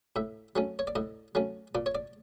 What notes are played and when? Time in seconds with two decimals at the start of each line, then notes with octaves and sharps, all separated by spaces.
0.16 A2 E5
0.56 F#3 A3 C#4
0.79 C#5
0.87 D5
0.96 A2 D#5
1.35 F#3 A3 C#4
1.75 A#2 D5
1.86 C#5
1.95 D5